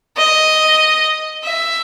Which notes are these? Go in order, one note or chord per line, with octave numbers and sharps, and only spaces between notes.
D#5
E5